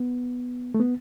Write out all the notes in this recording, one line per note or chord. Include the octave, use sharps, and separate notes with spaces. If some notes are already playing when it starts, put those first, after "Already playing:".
Already playing: B3
A3
B3